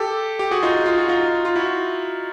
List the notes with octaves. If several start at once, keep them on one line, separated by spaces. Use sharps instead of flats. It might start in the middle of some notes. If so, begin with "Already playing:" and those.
Already playing: G4 A4
G4
F#4 G#4
D#4 F4
F4
F#4
D#4 F4
F4
E4 F#4